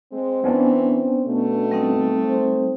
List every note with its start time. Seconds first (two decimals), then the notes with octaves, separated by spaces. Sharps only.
0.12 G#3 C4
0.44 E3 B3 C#4 D4
0.94 C4
1.26 B2 A3
1.71 G3 C4 D#4
2.24 C5